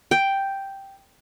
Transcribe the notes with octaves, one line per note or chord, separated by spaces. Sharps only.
G5